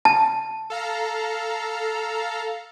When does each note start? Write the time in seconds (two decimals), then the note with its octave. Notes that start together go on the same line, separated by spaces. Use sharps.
0.05 A5
0.70 A4 F5 A#5